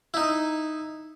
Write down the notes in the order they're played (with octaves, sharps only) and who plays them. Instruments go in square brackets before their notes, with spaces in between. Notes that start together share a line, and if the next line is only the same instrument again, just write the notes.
[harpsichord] D#4 E4